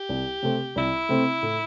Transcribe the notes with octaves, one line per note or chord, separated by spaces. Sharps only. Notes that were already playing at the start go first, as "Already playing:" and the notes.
Already playing: G4
C2
C3 A3 C4
C2 E4
C3 A3 C4
A2